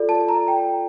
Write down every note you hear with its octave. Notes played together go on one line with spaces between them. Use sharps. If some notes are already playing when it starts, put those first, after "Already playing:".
Already playing: F4 A4 D5
A5
A#5
G5